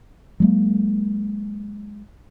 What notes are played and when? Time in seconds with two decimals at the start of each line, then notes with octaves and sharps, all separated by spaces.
0.40 F#3 G#3 A#3